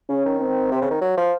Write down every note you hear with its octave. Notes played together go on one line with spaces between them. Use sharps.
C#3 C#4
D#3
C4
C3
C#3
D#3
F#3
F3